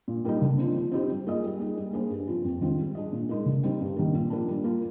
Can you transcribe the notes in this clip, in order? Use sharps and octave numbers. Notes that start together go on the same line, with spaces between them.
A#2
G3 A#3 D#4
D3
F3 C4
F3
C4 D#4 G4 C5
G3
A#3 F4 G#4 D#5
G3
A#3 D#4 G#4
G3
A#3 D4 G#4 C5
G2
F3 C4 F4
F2
D#3 G#3 C4 F4
G3
D4 G#4 D#5
A#2
G#3 D#4 A#4
D3
G3 C4 D#4
G2
D#3 G3 A#3
A#2
F3 A#3 D4
G3
A#3 F4